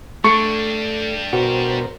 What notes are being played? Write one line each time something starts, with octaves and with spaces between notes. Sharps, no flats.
G3 A3 D4 C#6
B2 F#4 A#4 C5